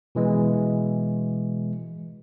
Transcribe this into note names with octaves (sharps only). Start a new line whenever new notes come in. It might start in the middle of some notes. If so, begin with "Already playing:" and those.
B2 E3 G#3